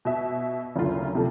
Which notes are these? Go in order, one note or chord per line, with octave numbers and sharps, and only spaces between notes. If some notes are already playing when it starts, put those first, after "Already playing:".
B2 E5
F#1 D2 F4
C3 F3 A3